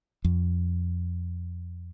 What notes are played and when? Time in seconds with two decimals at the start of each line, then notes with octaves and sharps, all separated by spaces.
0.24 F2